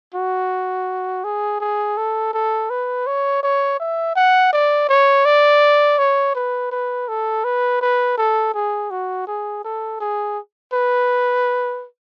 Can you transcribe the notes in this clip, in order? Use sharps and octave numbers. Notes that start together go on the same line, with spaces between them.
F#4
G#4
G#4
A4
A4
B4
C#5
C#5
E5
F#5
D5
C#5
D5
C#5
B4
B4
A4
B4
B4
A4
G#4
F#4
G#4
A4
G#4
B4